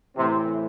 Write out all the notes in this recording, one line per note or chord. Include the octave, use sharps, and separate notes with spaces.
A2 C3 E3 C4